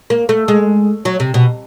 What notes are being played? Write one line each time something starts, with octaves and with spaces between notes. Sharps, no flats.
A#3
A3
G#3
F#3
C3
B2